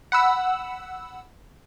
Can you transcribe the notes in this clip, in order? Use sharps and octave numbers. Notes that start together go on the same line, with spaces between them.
F#5 B5 E6